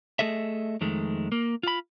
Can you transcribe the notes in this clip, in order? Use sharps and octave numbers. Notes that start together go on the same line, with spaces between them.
A3 G#4 A4 D#5 E5
F2 D#3 G#3 A3
A#3
F4 B5